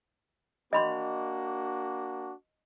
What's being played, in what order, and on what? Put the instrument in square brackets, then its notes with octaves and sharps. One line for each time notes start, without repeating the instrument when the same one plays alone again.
[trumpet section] A#3 D4 F#4 [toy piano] D#5 B5 C6